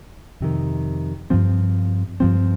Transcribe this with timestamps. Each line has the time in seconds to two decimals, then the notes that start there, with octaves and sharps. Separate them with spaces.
0.41 F2 C3 D#3
1.30 G2 F3 C4
2.20 G2 F3 C4